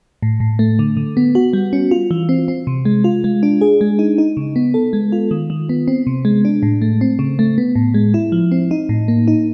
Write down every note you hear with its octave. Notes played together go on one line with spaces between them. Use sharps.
A2
A2
A3
D3
D3
B3
F#4
G3
C#4
F4
E3
C4
C4
C3
G#3
F4
G#3
D4
G#4
G#3
D#4
D#4
C#3
B3
A4
G#3
F4
D#3
D#3
B3
C4
C3
G#3
D4
A2
A3
C4
C#3
A3
B3
A2
G#3
E4
F3
C4
D#4
A2
A#3
D#4